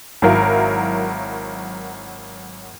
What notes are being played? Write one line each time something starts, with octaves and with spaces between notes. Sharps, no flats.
G#1 F#3 E4 A#4 F5